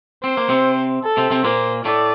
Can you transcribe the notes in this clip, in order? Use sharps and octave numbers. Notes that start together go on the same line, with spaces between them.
C4 C5
A#3
C3 C4
A4
C3 C4
C3 C4
A#2 A#3 C5
A2 A3 D5